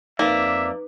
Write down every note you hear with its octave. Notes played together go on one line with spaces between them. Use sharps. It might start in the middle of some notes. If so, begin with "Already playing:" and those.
F2 A#3 D#4 B4 D5 E5